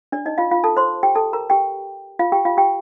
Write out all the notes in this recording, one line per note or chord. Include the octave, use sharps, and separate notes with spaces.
D4 D5
D#4 D#5
F4 F5
F4 F5
A4 A5
C5 C6
G4 G5
A4 A5
A#4 A#5
G4 G5
F4 F5
G4 G5
F4 F5
G4 G5